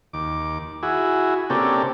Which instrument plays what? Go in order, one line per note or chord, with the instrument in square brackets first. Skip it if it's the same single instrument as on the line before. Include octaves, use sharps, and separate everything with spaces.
[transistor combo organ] D#2 D6
E4 F#4 G#4
C3 A#3 C#4 D4 G4 A4